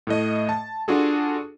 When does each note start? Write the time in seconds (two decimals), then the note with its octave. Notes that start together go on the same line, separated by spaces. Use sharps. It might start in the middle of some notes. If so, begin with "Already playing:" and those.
0.07 A2 A3 D#5
0.49 A5
0.88 D4 F4 F#4 G#4 A4